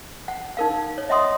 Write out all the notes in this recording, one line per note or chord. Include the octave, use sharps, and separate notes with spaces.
F#5
D#4 A#4 F5
C#5
D#5 E5 F#5 C6 D#6